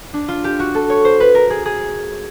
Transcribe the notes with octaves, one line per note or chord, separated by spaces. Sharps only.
D4
F4
G4
F#4
A4
C#5
C5
B4
A#4
G#4
G#4